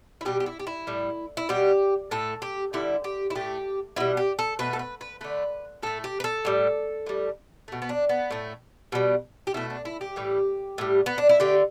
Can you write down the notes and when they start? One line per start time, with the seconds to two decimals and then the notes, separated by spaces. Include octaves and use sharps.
0.21 E4
0.25 B2 G3 G4
0.40 G4
0.46 E4
0.60 G4
0.67 E4
0.87 A2 G3
1.37 E4
1.49 B2 G3 G4
2.11 A2 A3 A4
2.42 G4
2.73 D3 G3 E4
3.04 G4
3.30 E4
3.35 A2 A3 G4
3.96 B2 G3 E4
4.17 G4
4.39 A4
4.59 B2 A3 B4
4.73 A4
4.79 B4
5.01 B4
5.21 D3 A3 B4
5.83 A2 A3 A4
6.04 G4
6.20 B4
6.24 A4
6.45 A2 G3
7.06 A2 G3
7.68 B2 A3
7.82 B3
7.89 D4
8.09 B3
8.31 A2 A3
8.92 B2 G3
9.47 G4
9.54 B2 A3 E4
9.70 D4
9.85 E4
10.01 G4
10.16 A2 E3 G3
10.78 A2 G3
11.06 B3
11.18 D4
11.29 E4
11.40 D3 A3 G4